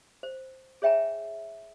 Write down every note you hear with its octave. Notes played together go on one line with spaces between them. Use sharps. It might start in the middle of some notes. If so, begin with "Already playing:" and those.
C5
G#4 C#5 E5 G5 G#5 A#5